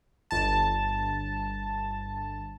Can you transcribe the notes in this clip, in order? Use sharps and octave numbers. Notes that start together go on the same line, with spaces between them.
G1 A5